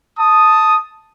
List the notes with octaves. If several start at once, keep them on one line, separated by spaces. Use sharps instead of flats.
A5 D#6